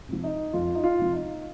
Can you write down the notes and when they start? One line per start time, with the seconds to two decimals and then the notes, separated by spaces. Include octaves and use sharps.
0.09 C3 F3
0.24 D#4
0.53 F2 F4
0.75 D#4
0.83 F4
0.99 C3 F3
1.13 D#4